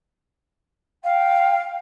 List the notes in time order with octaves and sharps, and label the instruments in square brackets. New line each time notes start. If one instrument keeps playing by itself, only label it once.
[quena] F5 [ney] G5